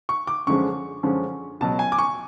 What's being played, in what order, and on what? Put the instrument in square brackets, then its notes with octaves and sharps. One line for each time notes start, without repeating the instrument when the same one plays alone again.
[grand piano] C#6
D6
F#2 D3 F3 G#3 C#4 C#6
F#2 D3 F3 G#3 C#4
C#2 B2 F#3 A5
G#5
D6
C#6